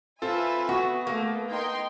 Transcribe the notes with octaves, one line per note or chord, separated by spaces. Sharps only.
C4 F4 A4 B4 E5 G#5
B3 F#4
A3 A#3
D#4 G5 C6